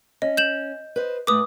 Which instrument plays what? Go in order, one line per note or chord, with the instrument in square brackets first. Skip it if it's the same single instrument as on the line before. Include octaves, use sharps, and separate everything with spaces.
[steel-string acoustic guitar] C#4 [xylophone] D#5
[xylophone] G6 E7 F#7
[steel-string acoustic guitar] B4 C5 D#5
[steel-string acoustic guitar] A2 A3 B4 [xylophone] D6 D#6